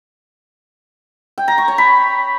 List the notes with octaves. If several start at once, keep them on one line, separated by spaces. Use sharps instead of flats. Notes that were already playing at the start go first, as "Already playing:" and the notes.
G5
A#5
C#6
C#5
B5